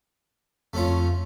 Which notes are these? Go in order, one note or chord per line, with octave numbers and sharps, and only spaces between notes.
F2 A3 C#4 F4